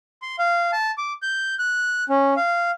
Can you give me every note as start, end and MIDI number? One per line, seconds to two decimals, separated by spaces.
0.22 0.36 84
0.39 0.71 77
0.73 0.91 81
0.98 1.13 86
1.22 1.55 91
1.59 2.04 90
2.09 2.34 61
2.37 2.71 77